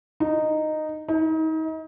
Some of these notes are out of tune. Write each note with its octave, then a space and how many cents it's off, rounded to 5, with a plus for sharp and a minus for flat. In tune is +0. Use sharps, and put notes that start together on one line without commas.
D#4 -10
D#4 +35